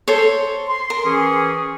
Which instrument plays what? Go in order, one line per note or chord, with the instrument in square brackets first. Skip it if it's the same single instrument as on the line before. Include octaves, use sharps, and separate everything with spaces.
[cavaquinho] A4 C5 C#5
[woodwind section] C6
[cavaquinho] A#4
[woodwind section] E3 C#4 G#4